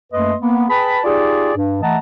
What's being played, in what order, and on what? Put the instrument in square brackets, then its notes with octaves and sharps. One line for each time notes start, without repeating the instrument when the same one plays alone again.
[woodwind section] F#2 A3 A#3 B4 D#5 C6
A#3 B3
G#4 B4 G5 A5 B5
D#4 F4 G4 G#4 D5
G2
E3 A3 D#5 F#5 A5 A#5